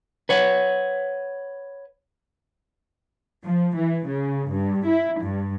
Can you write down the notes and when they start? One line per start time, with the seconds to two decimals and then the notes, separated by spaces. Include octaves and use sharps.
0.29 B4 C#5 F#5
3.45 F3
3.77 E3
4.08 C#3
4.51 G2
4.88 E4
5.23 G2